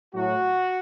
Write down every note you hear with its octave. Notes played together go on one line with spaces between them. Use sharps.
A2 F#3 A3 F#4